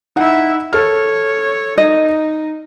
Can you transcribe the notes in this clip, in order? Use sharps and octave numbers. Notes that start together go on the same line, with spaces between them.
D#4 E4 E5 F#5
A4 C#5 F6
D#4 D#5